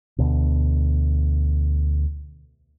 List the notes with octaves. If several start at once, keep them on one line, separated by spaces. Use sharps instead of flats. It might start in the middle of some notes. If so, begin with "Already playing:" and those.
D2 B2